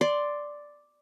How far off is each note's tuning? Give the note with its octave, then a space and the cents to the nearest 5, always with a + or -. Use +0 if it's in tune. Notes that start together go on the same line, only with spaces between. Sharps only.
D5 +0 C6 +0